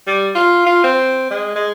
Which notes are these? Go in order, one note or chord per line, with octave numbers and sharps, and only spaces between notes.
G3
F4
F4
C4
G#3
G#3